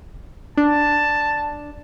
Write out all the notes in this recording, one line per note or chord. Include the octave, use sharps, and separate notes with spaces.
D4 A5